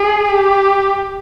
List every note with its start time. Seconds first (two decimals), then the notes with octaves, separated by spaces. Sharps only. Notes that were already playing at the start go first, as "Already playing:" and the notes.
Already playing: G#4
0.28 G4